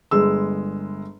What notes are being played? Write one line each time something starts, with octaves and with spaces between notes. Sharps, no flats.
G1 G#3 E6